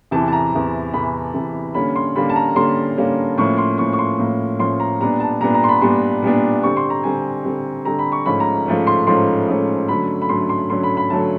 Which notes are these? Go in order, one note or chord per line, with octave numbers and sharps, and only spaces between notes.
E2 C3 E3 A5
A5
A#5
E2 C3 E3
E2 C3 E3 B5
E2 C3 E3
D3 G3 A#3 C#4 B5
C6
D3 G3 A#3 C#4 B5
A5
A#5
D3 G3 A#3 C#4 C6
D3 G3 A#3 C#4
A2 F3 A#3 C#4 C#6
C6
A2 F3 A#3 C#4 C#6
C#6
C6
A2 F3 A#3 C#4
A2 F3 A#3 C#4 C6
A#5
A#2 G3 B3 D4 A#5
A5
A#2 G3 B3 D4 A#5
A#5
C6
B5
A#2 G3 B3 D4 C6
A#2 G3 B3 D4
D3 G3 C4 C#6
C6
A#5
D3 G3 C4 G#5
D3 G3 C4
D3 G3 C4 A#5
B5
C#6
G#2 F3 A3 C#4 B5
A#5
G#2 F3 A3 C#4
C6
G#2 F3 A3 C#4 C6
G#2 F3 A3 C#4
D3 F#3 A3 C#4 B5
B5
D3 F#3 A3 C#4 C6
C6
D3 F#3 A3 C#4 C6
B5
B5
D3 F#3 A3 C#4 A5